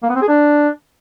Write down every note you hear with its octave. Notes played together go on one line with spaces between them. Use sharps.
A#3
B3
C4
G#4
D4